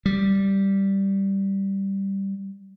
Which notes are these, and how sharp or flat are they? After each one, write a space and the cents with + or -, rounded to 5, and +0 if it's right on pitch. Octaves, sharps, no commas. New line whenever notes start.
G3 -5